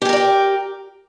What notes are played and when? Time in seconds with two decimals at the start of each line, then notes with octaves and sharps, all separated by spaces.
0.02 G4
0.05 G#4
0.09 A#4
0.13 D5
0.16 G5